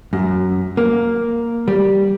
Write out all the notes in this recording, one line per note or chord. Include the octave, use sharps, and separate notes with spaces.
F#2
A#3
G3